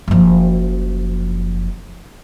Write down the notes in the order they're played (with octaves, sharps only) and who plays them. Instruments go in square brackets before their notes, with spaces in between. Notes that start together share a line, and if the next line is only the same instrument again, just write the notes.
[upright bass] F#1 F3